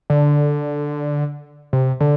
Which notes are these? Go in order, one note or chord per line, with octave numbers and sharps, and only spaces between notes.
D3
C3
D3